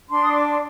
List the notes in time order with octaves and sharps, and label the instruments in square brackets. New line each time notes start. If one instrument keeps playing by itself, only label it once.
[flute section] D4 C6
D#6
D6
C6